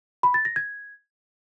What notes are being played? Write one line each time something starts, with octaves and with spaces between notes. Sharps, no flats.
B5
A6
A#6
G#6